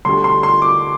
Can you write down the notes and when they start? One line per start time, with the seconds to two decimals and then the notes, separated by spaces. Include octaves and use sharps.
0.05 D2 D3 G3 C6
0.24 C6
0.43 C6
0.62 D6